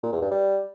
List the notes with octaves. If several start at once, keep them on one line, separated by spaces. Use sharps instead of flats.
A#2
E2
G2
G3